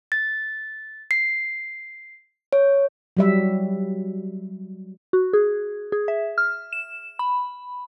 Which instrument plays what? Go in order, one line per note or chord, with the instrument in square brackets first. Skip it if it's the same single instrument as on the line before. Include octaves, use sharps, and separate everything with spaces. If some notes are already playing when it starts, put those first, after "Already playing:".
[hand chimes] A6
C7
C#5
[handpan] F#3 G3 E5
[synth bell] F#4
G#4
G#4
E5
F6
E7
B5